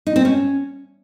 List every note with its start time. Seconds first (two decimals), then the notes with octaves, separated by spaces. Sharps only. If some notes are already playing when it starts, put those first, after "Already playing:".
0.07 D#4
0.16 C4
0.25 C#4